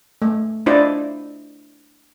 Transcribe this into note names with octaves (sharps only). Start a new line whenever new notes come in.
A3
D4 E4 F4 C5 D5 D#5